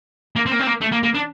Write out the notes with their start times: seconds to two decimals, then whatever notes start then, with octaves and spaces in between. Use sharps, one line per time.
0.36 A#3
0.46 C4
0.51 A#3
0.60 C4
0.67 A#3
0.81 A3
0.92 A#3
1.03 A#3
1.15 D4